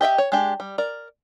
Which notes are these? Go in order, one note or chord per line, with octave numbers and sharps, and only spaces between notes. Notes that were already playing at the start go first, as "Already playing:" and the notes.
G4 D#5 E5 G5
C#5
G#3 D4 G4 A5
G3
A#4 D5